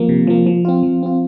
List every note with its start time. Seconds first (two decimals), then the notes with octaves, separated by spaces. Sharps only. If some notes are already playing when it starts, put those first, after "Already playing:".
Already playing: F3 A#3
0.09 C3
0.27 F3 A#3
0.47 F3
0.65 C4 F4
0.83 F3
1.03 C4 F4